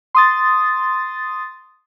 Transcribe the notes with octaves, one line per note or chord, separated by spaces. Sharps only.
C6 D#6 A6